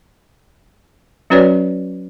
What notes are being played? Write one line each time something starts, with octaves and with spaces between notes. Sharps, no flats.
F#3 C#4 F#4 B4 C#5 D5